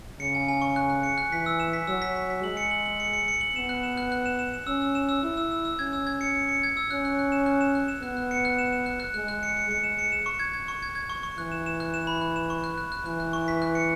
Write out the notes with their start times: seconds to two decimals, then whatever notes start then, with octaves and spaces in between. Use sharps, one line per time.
0.20 C#3 C#7
0.35 G#5
0.48 G#5
0.62 C#6
0.76 F#6
0.90 F#6
1.03 C#7
1.18 F#6
1.31 E3 B6
1.46 E6
1.60 E7
1.73 B6
1.87 F#3 E6
2.02 B6
2.16 B6
2.30 B6
2.43 G#3 F#7
2.57 C#7
2.71 F#7
2.86 F#7
3.00 C#7
3.13 C#7
3.28 C#7
3.41 F#7
3.56 B3 E7
3.69 F#6
3.83 E7
3.97 F#6
4.12 F#6
4.26 E7
4.39 E7
4.54 E7
4.67 C#4 E6
4.82 E6
4.95 E7
5.09 E6
5.23 E4 E6
5.37 E6
5.52 E6
5.65 E6
5.79 C#4 G#6
5.93 E6
6.07 G#6
6.21 C#7
6.35 C#7
6.49 C#7
6.63 G#6
6.77 E6
6.91 C#4 F#6
7.05 F#6
7.19 F#6
7.32 E7
7.46 F#6
7.61 E7
7.75 F#6
7.88 E7
8.02 B3 F#6
8.17 F#6
8.31 C#7
8.45 F#6
8.58 E7
8.73 E7
8.86 F#6
9.00 F#6
9.14 G#3 F#6
9.28 F#6
9.43 C#7
9.57 C#7
9.70 G#3 C#7
9.84 E7
9.99 C#7
10.12 E7
10.26 C#6
10.39 G#6
10.53 G#6
10.68 C#6
10.83 G#6
10.95 G#6
11.09 C#6
11.23 C#6
11.37 E3 F#6
11.52 E7
11.66 E7
11.80 F#6
11.94 E7
12.07 B5
12.21 F#6
12.36 E7
12.50 C#6
12.64 F#6
12.78 F#6
12.92 F#6
13.06 E3 F#6
13.20 F#6
13.33 C#6
13.48 B6
13.62 F#6
13.75 C#7